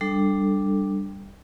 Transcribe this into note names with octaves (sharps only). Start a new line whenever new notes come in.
G3 D4 A4